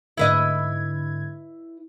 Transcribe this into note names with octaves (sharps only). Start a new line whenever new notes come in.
G#2 D3 E4 B4 D#5 G#6